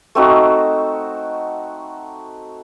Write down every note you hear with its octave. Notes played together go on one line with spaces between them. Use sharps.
A3 C4 D#4 F#4